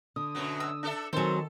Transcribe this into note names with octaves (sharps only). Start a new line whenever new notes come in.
D3 D#6
F#2 B2 F#3
E6
D4 A4 E5
D#3 F#3 C4 G#4 A4 C5